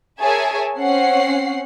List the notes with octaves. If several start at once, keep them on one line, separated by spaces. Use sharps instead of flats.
G#4 A#4 C#5 E5 G#5 A5
C4 C#4 F#5 C7